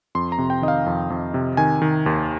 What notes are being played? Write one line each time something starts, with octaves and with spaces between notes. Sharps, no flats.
F2 C6
A#5
C3
G5
D#3 D#5
F5
F2
F2
C3
D#3 G#5
D#3
D#2